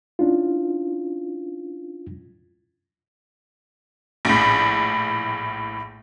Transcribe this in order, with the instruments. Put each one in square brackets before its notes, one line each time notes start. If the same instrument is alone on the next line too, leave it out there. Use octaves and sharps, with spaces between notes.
[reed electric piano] C#4 D4 E4 F4
[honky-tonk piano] A#1 A2